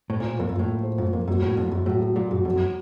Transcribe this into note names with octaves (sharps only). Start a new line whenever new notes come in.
A2 C5
A#2 F4
F2 A#3
F#2 F4
A2
A4
C5
F#2 F4
F2 A#3
F#2 F#3
A2 F#3
F2 F#4
F#2 F#3
A2 F#3
F#3
A#2 F#3
F#2 F#3
F2 F#4
F#2
F#4